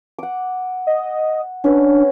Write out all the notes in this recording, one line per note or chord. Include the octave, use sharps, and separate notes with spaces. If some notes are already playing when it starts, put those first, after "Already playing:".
F#5 D6
D#5
C#4 D4 B4